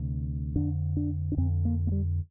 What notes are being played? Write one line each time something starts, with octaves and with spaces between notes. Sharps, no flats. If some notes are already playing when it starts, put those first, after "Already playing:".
Already playing: D2 C3
F2 D3 D4
D4
D4
F2 D3 C4
A#3
A#3
G3